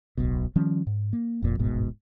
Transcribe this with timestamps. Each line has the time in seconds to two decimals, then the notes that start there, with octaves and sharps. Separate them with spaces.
0.17 D1 B1 B2
0.56 D#3 F3 G3 C#4
0.87 G#2
1.13 A#3
1.42 F1 F2 A#2
1.59 D1 G1 G#2 B2